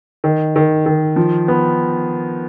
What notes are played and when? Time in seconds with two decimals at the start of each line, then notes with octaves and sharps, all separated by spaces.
0.24 D#3
0.56 D#3
0.86 D#3
1.16 F3
1.48 B3